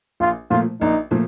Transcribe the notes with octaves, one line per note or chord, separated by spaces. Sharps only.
A#1 F4
A#2 F3 A3 F4
A#1 D#4
A#2 F3 A3